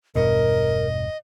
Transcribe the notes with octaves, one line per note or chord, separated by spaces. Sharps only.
E1 G2 B2 A#4 D#5